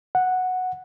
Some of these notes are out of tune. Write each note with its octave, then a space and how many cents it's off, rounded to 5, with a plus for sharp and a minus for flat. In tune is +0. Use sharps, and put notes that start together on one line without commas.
F#5 -5